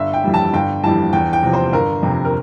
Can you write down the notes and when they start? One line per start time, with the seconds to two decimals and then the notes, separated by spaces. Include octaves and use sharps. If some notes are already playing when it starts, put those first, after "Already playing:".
Already playing: G1 E5
0.13 G5
0.24 F2 E3 G3
0.34 A5
0.53 G1 G5
0.84 F2 E3 G3 A5
1.13 E2 G5
1.33 G5
1.43 C3 F3
1.53 C5
1.73 G1 A#4
2.03 F2 C3
2.25 A#4